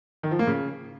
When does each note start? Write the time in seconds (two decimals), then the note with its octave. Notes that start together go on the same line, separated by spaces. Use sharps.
0.23 D#3
0.31 F3
0.39 A#3
0.47 C#3